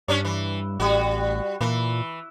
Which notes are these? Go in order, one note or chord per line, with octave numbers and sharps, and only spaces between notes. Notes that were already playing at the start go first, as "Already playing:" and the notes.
G2 C#4 D4 C#5
E3
A1 G3 F#4
A#2 E3